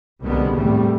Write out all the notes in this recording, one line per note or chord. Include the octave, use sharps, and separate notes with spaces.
C2 B2 D3 G3 G#3 B3
E2 A2 C3 E3 G3 A3